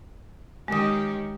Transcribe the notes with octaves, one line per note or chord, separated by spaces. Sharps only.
D#3 G#3 C#4 G4 D#6